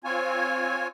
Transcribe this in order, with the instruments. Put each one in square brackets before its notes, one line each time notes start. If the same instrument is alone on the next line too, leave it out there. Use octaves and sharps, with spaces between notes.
[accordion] C4 F4 C#5 G#5